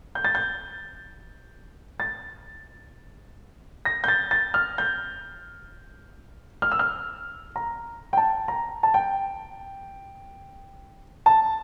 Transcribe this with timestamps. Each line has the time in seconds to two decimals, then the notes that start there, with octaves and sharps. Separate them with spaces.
0.15 G6
0.25 A6
0.35 G6
2.00 A6
3.85 A#6
4.04 G6
4.08 A6
4.31 A6
4.54 F6
4.78 G6
6.62 F6
6.72 E6
6.79 F6
7.56 A#5
8.13 G5
8.17 A5
8.48 A#5
8.83 A5
8.94 G5
11.26 A5